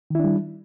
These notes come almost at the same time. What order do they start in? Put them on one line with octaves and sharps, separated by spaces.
D#3 E4 D4 G3